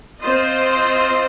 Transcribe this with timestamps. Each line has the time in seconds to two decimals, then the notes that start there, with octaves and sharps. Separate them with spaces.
0.19 C4 F4 C5 D#5